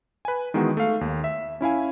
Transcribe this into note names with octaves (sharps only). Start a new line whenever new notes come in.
B4 G#5
D#3 E3 G#3 B3 D#4 F#4
A3 F5
D#2
E5
C#4 E4 F5 G#5